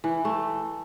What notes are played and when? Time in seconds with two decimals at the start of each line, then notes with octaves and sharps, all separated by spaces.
0.04 E3
0.25 A3